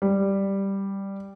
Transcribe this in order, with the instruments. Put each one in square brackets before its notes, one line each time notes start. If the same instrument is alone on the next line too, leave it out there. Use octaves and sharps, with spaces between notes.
[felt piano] G3